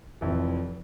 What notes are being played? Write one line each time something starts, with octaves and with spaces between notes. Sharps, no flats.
F1 F2 E3